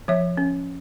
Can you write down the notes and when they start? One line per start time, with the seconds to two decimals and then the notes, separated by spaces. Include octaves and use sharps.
0.08 F3 C#5 E5
0.37 C#4